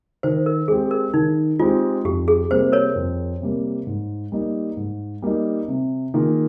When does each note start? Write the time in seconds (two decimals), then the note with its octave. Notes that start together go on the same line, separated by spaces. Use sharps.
0.23 D#3 C5
0.46 A#4
0.68 G#3 C4 G4 G#4
0.91 A#4
1.14 D#3 D#4
1.59 G#3 C4 F4 G4
2.04 F2 G4
2.28 G#4
2.50 C3 G3 A#3 C5
2.72 A#4 C#5
2.96 F2
3.41 C3 G3 A#3
3.87 G#2
4.32 G3 A#3 D#4
4.77 G#2
5.22 G3 A#3 D#4
5.68 C3
6.14 D#3 A#3 F4 G#4